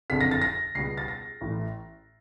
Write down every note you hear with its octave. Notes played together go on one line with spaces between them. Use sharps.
F#1 F2 D3 B6
A#6
A6
A#6
C#2 B2 G3 B3 C7
A6
A#6
A1 A2 E3